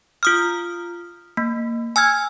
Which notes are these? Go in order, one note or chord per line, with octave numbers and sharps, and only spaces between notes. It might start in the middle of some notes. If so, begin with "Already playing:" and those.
F4 D#6 F6
A#3
G#5 E6 F6 G#6